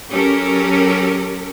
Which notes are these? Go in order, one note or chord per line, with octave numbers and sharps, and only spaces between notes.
F#3 C#4 G4 A4 A#4